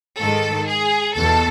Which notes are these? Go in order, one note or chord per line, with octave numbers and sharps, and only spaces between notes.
G#2 D#3 A4
G#4
E2 B2 A4